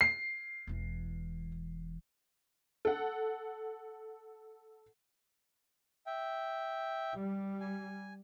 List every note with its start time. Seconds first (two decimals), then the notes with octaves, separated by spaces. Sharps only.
0.01 C7
0.67 E1 E3
2.85 A4 F#5
6.07 E5 G5
7.15 G3
7.61 G#5